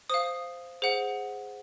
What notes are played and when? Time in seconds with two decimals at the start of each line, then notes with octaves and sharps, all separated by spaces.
0.10 C5 F5 D#6
0.82 G#4 C5 F#5